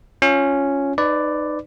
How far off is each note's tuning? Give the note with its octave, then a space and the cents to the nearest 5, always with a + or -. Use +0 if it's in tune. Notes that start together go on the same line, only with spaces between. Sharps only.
C#4 +0 F4 +0
D#4 -20 B4 +20 D5 +0